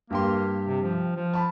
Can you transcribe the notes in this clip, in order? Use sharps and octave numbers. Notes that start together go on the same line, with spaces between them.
G2 A#3 G4 C6
C3
F3
F3
A5 B5